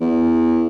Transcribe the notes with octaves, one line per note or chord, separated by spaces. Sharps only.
E2